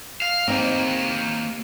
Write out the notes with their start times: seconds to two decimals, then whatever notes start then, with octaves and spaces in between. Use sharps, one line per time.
0.22 F5
0.48 A#3 C4 D#4 G4